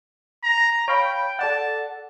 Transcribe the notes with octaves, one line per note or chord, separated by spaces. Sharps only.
A#5
C#5 F5 G5 B5
A4 D5 F#5 A5